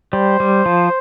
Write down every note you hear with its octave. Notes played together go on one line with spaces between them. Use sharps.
G3 C5
G3
F3